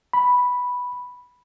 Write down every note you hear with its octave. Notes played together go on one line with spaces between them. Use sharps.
B5